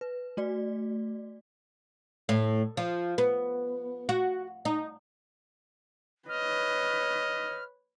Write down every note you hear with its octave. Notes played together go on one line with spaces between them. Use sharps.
B4
A3 F#4 D5
A2
F3
B3
F#4
D#4
B4 C#5 D#5 F6